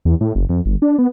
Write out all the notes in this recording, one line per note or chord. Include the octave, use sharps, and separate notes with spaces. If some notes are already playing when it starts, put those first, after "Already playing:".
E2
A2
F#1
F2
G1
D4
B3